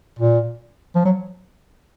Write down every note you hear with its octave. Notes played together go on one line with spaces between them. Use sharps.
A#2
F3
F#3